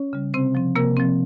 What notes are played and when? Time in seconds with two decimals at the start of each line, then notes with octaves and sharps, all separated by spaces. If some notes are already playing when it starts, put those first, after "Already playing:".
Already playing: C#4 C#5
0.13 C#3 G3
0.34 C3 C4 C5
0.55 F3 C4
0.76 C3 A#3 A#4
0.97 F3 C4